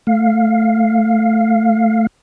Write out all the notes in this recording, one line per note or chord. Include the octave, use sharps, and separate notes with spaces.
A3 F5